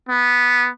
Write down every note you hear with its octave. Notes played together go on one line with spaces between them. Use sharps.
B3